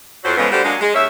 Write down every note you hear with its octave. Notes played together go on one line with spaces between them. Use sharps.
F2 F#3 C5
A2 C#3 E3 F3 G#3 B3
D3 G3 A3 F#4 G4 C5
F#3 G#3 A#3 C#4 D4
G#3
D#2 A#3 C#4 E5